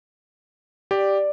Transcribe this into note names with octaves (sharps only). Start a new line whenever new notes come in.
G4 D5